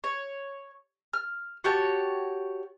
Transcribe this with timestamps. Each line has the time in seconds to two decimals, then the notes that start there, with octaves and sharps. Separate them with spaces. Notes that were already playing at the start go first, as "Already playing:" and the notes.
0.04 C#5
1.13 F6
1.64 F#4 G4 C#5 A5